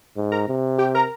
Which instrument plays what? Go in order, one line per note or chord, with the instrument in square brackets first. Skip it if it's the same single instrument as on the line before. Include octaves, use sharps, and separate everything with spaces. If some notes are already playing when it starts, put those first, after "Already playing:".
[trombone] G#2
[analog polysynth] A#4 A#5
[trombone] C3
[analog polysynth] G4 G5
A#4 A#5